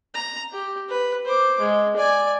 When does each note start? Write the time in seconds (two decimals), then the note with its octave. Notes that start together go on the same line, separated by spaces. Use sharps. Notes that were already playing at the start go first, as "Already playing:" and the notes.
0.14 A#5
0.52 G4
0.89 B4
1.25 C5 D6
1.60 G#3
1.96 D5 G#5